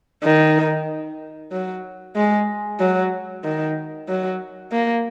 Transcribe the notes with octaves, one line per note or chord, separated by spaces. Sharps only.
D#3
F#3
G#3
F#3
D#3
F#3
A#3